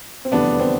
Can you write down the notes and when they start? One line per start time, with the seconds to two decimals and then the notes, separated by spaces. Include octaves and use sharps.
0.25 C4
0.32 F1 E2 D3 G3 B3 D4
0.60 C4